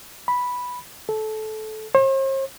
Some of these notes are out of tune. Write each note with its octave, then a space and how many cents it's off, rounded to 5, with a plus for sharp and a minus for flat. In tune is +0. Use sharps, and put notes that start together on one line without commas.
B5 -5
A4 -20
C5 +45